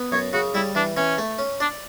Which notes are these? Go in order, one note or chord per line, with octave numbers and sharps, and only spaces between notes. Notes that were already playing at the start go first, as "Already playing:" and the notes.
Already playing: B3
F#2 C#5
C#3 F#4
G3 E4
E3 D4
E3 C#4
A3
C#4
D4 D5